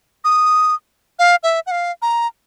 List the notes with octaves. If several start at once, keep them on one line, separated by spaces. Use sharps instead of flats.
D#6
F5
E5
F#5
F5
A#5